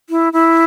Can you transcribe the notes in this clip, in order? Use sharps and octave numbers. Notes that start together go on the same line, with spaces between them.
E4
E4